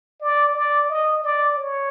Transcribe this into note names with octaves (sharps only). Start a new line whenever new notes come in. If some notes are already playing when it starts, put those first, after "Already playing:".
D5
D5
D#5
D5
C#5